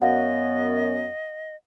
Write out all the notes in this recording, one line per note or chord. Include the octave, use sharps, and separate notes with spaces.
F#2 B3 D#5 F5 F#5